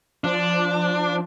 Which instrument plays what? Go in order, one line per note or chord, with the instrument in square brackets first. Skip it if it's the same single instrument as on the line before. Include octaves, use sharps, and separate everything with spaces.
[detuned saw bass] F3 [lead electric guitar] D4